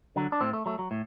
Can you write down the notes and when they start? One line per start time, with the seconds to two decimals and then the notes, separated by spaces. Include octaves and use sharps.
0.16 D3 F#3
0.32 D4
0.41 A2 C4
0.53 A3
0.66 F#3 A3
0.79 F#3
0.91 A2